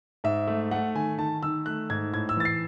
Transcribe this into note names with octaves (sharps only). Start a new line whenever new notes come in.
G#2 E5
A3
A3 F#5
D#3 G#5
D#3 A5
D#3 E6
A3 F#6
G#2 G#6
A2 G#6
E6
E3 A6
C7